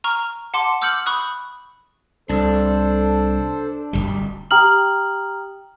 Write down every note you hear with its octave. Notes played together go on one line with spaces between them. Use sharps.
A#5 C#6 F6
F#5 A5 C6 D6
D6 E6 F6 G6 C#7 F#7
B5 C#6 D#6 F#6
C2 D4 A4 C5
D1 D#2 G3
G4 G5 A#5 D#6 F6 F#7